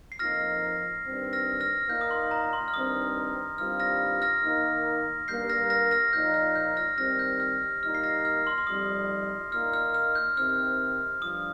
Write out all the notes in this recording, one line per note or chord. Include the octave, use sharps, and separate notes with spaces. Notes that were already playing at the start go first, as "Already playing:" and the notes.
C7
F2 F3 A#3 D#4 F6 A#6
G2 D#3 C4
F6 A#6
F6 A#6
A#2 A#3 D#4 G6
D#6
C6
A#5
C6
F6
G2 D#3 C4 D#4 D#6
G2 D#3 G3 C4 F4 F6
F6 A#6
F6 A#6
D#3 A#3 D#4
G2 G3 A#3 G6 C7
F6 A#6
F6 A#6
F6 A#6
A#2 F3 D#4 G6
F6
G6
F6 A#6
D#3 G3 C4 F6 A#6
G6
F6
A#2 G3 A#3 D#4 F6
C7
F6 A#6
F6
C6
C6
F2 C3 G3 D#4 D#6
A#2 A#3 D#4 F6
F6
F6
G6
C3 D#3 C4 F6
G2 F3 D#6